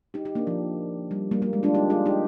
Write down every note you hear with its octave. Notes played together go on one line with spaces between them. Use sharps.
D#4 G4
D#4 G4
A#3 D4
F3
G3
G3 A#3
G3 A#3
G#3
D4 F4
D#4 G4
F4 G#4
D#4 G4